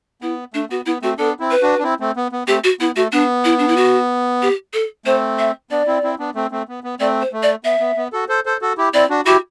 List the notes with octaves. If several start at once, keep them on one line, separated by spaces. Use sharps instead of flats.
B3 E4
A3 D4
B3 F#4
B3 E4
A3 C4 F#4
B3 D4 A4
C4 E4
B4
D4 F#4
D4
C4 E4
A3 C4
B3
B3
A3 C4 G4
F#4
B3 E4
A3 F#4
B3 D4
E4
D4
E4
F#4
G4
A4
A3 C4 C5
E5
B3 D4 D5
C4 E4
C4 E4
B3 D4
A3 C4
A3 C4
B3
B3
A3 C4 D5
C5
A3
D5
B3 E5
B3
B3
F#4 A4
A4 C5
A4 C5
F#4 A4
E4 G4
C4 E4 D5
D4 F#4
E4 F#4 G4